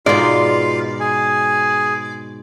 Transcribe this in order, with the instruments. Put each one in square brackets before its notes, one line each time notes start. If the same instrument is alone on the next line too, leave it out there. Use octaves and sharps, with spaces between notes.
[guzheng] G#2 B2 [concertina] F4 F5 [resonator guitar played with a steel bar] D5
[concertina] G#4 G#5